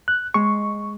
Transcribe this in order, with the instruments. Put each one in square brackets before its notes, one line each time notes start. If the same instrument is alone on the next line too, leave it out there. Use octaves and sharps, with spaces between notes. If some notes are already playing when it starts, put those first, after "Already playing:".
[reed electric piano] F#6
[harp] G#3 [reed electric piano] C#6